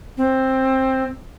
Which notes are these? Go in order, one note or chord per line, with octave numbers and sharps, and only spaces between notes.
C4